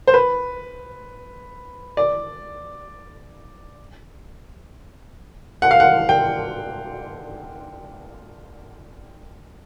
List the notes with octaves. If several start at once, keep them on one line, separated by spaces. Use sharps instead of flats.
C5
B4
D5
F#5
F5
F#5
G5